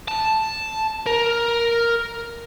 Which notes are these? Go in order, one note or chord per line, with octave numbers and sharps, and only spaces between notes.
A5
A#4